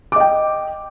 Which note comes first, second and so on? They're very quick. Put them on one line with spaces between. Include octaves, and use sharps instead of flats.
D6 D#5 G5